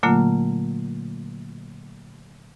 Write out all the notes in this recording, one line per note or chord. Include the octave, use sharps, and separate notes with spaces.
A#2 D3 F#3 A3 A#3 F4